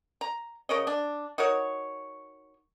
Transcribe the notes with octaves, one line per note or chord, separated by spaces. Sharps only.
A#5
C#3 A#4 C#5 D#5
D4
D#4 F#4 A#4 C#5